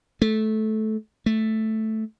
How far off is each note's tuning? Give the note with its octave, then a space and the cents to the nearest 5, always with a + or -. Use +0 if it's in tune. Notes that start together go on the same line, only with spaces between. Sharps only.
A3 -15
A3 -5